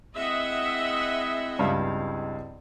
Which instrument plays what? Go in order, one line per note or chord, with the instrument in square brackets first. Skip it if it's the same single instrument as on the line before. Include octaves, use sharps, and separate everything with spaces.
[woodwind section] G#3 C4 E4 [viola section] D#5 E5 F#5
[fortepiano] C#2 G2 F5